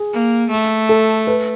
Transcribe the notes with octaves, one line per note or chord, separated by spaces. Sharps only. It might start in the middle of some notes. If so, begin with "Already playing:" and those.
Already playing: G#4
A#3
A3
A4
B4